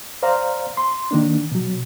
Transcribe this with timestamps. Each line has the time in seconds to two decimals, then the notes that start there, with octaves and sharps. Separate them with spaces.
0.23 C5 D5 F5 A#5
0.77 C6
1.11 D#3 A#3 D4
1.52 B2 F#3